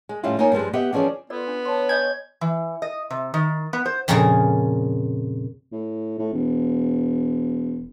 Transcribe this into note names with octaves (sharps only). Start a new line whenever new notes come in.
G#3
F2 A2 G3 C#4 E4 F4
A#3 D#4 F4 C#5 G#5
G2 F3 G3 G#3
B3 G4 D#5 E5 F#5
E3 F3 C#4 G#4 D5
B3 F4 A4 A#4 D5
D4
C#5 A5 C6
D#5 G#5 G6 G#6
E3
D#5
C3
D#3
B3
C5
F2 A#2 C#3 G#4 A#4
A2
A2
E1